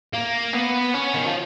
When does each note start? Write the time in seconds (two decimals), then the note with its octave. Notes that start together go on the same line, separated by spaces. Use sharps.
0.13 A#3
0.53 B3
0.94 C#4
1.14 D#3
1.26 F3